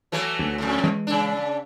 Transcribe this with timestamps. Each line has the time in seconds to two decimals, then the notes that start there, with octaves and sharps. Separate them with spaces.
0.12 E3 F#3 A3
0.39 D2
0.58 F2 A2
0.84 E3 G#3
1.07 C#3 D4